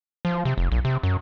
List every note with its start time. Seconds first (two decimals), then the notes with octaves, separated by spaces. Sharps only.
0.25 F3
0.45 C3
0.58 F1
0.72 A#1
0.85 C3
1.03 F#2